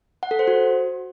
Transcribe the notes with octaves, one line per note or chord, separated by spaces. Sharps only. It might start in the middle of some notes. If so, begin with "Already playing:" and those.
F#5
A4
C5
F#4